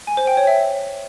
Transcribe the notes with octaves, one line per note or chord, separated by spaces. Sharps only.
G#5
C5
G5
C#5
E5